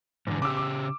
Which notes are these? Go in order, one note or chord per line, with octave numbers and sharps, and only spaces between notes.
E2 G#2 D3
C#3 G4 D6 E6
D6